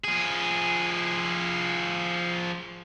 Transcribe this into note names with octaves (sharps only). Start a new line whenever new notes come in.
F3 G#4